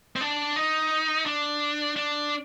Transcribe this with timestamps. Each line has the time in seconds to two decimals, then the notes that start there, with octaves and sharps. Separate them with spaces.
0.16 C4
0.21 D4
0.56 D#4
1.26 D4
1.96 D4